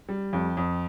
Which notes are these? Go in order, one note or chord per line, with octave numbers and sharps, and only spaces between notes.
G3
F2
F2